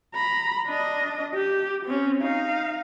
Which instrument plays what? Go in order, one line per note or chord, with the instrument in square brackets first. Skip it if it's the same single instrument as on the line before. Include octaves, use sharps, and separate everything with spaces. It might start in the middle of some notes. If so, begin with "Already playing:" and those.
[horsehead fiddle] A#5 B5
D4 D#5
G4
C4 C#4
D#4 F5